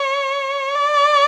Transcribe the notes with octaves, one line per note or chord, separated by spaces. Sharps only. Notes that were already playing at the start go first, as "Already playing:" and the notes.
Already playing: C#5
D5